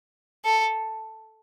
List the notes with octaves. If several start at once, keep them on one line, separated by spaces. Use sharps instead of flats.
A4